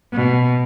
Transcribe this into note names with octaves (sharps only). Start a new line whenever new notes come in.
B2